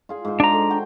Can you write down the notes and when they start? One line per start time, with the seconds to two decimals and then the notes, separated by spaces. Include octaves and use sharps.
0.09 F4 G#4 G#5
0.25 G#2 C5
0.40 D4 C5 A#5
0.53 A4
0.69 F#4 G5 C6